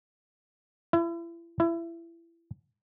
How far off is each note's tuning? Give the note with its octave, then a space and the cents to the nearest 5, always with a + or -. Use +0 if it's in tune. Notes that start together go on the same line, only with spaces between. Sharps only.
E4 +35
E4 +25